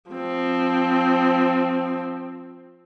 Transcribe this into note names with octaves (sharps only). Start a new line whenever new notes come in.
F3 C4